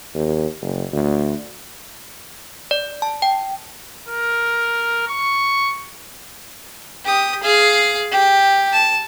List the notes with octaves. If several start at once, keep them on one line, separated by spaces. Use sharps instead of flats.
D#2
F#1
D2
D5
A5
G5
A#4
C#6
G4 D#6
G#4 F5
G4
A5